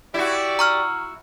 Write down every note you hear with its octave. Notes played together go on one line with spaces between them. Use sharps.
E4 F#4 G4 D5
A#5 C#6 F6